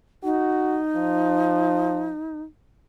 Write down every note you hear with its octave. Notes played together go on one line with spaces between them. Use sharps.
D#4 F#4
F3